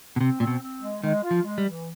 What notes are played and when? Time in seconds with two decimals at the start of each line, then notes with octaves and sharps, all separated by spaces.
0.16 B2
0.20 C3 C4
0.40 A#2 C4
0.47 B2
0.62 C4
0.82 G#3
1.03 D#3 G#3
1.23 F4
1.31 F3
1.44 G#3
1.58 G3
1.65 E3